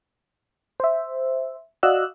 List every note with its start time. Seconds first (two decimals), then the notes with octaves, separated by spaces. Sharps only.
0.80 C5 E5
1.83 F#4 D5 D#5 F5 E6 F#6